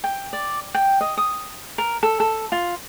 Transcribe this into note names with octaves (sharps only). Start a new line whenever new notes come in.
G5
D5
G5
D#5
D#6
A#4
A4
A4
F4